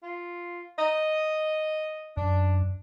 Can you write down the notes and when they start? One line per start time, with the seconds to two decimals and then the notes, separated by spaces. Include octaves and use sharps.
0.03 F4
0.79 D#5
2.17 F#2 D4